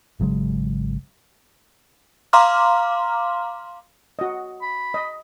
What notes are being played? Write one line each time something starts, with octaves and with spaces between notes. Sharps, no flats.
G#1 C#3 F#3 G#3
F5 A#5 C6 D6 F6
F#4 D#5
B5
D#5